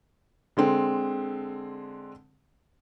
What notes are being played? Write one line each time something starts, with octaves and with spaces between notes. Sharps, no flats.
D3 G#3 C4